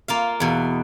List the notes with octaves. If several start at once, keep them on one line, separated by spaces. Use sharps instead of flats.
A#3 F4 F5
E2 B2